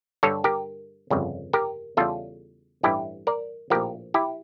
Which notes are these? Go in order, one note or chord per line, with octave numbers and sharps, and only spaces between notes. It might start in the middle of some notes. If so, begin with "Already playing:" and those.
G2 D3 G3 A4 C#5
G4 A#4
G1 F2 C#3 G3
G4 A#4
E2 C#3 G3 F4 A4
A1 G2 E3 G3 E4 G4
A#4 D5
A#1 A2 F3 G4 A#4
E4 G4